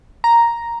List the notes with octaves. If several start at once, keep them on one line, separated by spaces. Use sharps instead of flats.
A#5